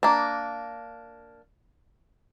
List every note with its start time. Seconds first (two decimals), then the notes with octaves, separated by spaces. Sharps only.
0.03 A#3 D4